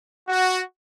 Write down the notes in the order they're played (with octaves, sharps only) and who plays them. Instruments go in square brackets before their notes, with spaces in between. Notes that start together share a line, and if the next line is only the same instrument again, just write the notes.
[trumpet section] F#4